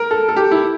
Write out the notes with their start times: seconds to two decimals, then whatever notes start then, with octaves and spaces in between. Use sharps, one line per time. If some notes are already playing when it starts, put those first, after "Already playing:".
Already playing: A#4
0.11 A4
0.29 A4
0.36 G4
0.51 E4